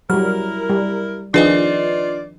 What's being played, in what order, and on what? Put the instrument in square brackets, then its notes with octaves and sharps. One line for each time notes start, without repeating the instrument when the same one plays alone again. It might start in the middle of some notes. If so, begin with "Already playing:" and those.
[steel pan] F#3 G3 [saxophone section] E4 A#4 [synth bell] F6
[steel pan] G3
[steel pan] D#3 F3 G#4 [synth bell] D4 B4 D#5 [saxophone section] F4 D5